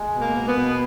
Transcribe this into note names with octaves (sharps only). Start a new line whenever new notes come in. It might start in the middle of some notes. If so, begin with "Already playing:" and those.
Already playing: G#3
B2
A#3
B2
B3
B2